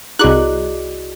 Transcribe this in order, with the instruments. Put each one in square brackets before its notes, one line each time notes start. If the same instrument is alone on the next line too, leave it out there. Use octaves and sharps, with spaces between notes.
[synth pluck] C2 F#6 [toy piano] E4 G#4 D6 [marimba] F#4 D5 D#5